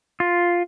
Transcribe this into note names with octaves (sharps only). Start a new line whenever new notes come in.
F4